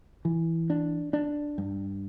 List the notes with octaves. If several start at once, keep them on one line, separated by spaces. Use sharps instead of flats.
E3
D4
D4
G2